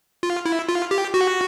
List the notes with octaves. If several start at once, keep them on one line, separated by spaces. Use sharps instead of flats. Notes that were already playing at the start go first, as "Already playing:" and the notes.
F4
E4
F4
G4
F#4